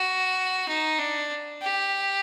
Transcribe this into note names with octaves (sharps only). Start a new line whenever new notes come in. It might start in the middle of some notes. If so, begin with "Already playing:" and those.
Already playing: F#4
D#4
D4
G4